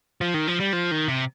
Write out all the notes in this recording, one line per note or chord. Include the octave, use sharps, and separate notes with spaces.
F3
D#3
F3
G3
F3
D#3
C3